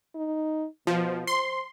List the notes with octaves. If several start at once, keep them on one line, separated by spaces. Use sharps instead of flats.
D#4
B2 F3
C5 C6